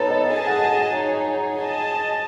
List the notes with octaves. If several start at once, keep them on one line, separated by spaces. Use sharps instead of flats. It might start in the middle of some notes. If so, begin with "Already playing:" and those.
Already playing: B3 D#4 A4 C#5
D#5
G#4 D#5 A5
F#5
G#5
G#5
D#4 G#4 C#5
G#4 D#5 A5